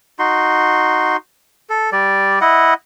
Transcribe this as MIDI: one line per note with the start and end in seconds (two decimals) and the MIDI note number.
0.19 1.17 63
0.19 1.17 66
0.19 1.17 84
1.70 1.90 69
1.92 2.39 55
1.92 2.39 74
2.41 2.74 64
2.41 2.74 75
2.41 2.74 78